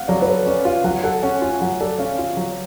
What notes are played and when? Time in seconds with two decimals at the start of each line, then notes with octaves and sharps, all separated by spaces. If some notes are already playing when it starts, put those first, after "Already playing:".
Already playing: F5 F#5
0.08 F#3 D5
0.22 B4
0.27 A4 C#5
0.46 C#4 D5
0.65 F4 F5
0.84 F#3 F#5
1.04 A4 F#5
1.23 C#4 F#5
1.41 F4 G#5
1.60 F#3 F#5
1.80 A4 D5
1.99 C#4 F5
2.18 F4 F5
2.37 F#3